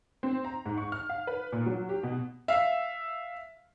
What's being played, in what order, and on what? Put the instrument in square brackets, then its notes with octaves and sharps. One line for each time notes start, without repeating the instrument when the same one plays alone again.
[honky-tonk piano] C4
A#5
G#2
C#6
F6
F5
B4
A#2
F#3
G4
B2
[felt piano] E5 F5